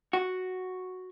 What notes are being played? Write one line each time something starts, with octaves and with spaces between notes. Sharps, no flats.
F#4